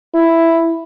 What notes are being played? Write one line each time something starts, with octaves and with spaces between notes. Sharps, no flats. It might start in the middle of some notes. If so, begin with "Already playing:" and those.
E4